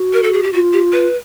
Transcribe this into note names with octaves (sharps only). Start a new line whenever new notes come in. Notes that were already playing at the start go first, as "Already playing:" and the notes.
Already playing: F#4
A#4
A4
G#4
G4
F4 F#4
G4
B4